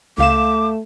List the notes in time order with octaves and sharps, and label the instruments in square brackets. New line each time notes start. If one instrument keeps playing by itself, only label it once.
[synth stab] C#2 F5 E7 [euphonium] A3 [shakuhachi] D6